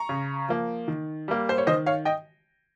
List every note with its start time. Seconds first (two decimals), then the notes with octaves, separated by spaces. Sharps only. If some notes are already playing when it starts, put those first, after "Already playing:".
Already playing: A#5 C#6
0.09 C#3
0.49 F3 A#3
0.88 D#3
1.28 G3 A#3
1.49 C5
1.58 C#5
1.67 D#3 C5 D#5
1.86 C#5 F5
2.05 D#5 G5